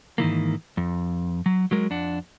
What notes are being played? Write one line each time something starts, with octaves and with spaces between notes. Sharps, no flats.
G#2 D#3 E3 A#3
F2
F#3
F#3 G#3 A#4
F2 D4 F#5